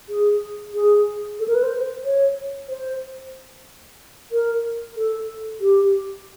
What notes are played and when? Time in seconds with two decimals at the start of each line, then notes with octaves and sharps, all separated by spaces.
0.09 G#4
0.74 G#4
1.40 A4
1.48 A#4
1.55 B4
1.63 C5
2.05 C#5
2.69 C5
4.32 A#4
4.97 A4
5.61 G4